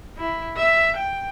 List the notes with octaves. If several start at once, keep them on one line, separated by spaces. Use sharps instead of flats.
E4
E5
G5